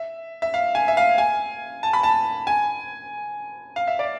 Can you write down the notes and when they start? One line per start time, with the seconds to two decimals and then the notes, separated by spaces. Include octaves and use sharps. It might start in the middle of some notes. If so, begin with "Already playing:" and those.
Already playing: E5
0.42 E5
0.54 F5
0.75 G#5
0.88 E5
0.97 F5
1.18 G#5
1.83 A5
1.93 B5
2.03 A5
2.47 G#5
3.76 F5
3.88 E5
3.99 D5